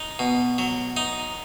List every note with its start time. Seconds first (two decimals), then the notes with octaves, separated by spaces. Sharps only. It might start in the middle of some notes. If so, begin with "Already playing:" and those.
Already playing: D#4
0.19 B2
0.58 F#3
0.97 D#4